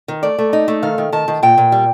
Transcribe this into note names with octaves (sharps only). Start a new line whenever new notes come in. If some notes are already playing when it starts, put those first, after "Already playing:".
D#3
A3 D5
A3
D#4
A3
D#3 F5
D#3
D#3 A5
D#3
A#2 G5
A#2
G3